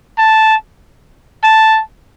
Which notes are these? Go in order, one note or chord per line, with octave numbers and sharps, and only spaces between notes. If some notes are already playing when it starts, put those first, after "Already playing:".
A5
A5